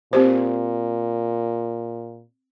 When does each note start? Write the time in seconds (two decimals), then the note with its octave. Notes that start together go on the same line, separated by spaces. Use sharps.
0.13 A#2 C4 G4 C5